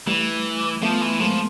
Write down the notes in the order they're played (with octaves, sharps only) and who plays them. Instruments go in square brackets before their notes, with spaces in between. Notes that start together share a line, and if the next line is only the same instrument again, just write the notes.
[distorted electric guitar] E3 [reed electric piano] G3 A3
[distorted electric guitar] F3 [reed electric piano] A3 B3
[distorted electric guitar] E3
[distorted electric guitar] F3 [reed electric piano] G#3 A#3